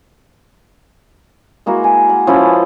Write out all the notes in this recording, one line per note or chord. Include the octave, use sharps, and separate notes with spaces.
G#3 A#3 E4 F#4
G#5
F#5
F3 C#4 E4 B4